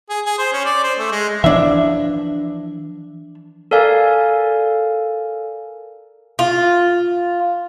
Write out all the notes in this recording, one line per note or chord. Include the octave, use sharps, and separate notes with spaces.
G#4
G#4
C5
C#4
D5
C5
A3
G#3
E3 F3 D4 E5
A4 A#4 D5 F5 G#5
F4